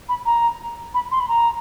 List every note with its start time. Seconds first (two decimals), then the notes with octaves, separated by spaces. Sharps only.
0.09 B5
0.26 A#5
0.94 B5
1.11 C6
1.20 B5
1.28 A#5